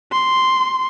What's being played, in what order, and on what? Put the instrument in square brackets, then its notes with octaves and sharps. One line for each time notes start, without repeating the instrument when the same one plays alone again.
[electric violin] C6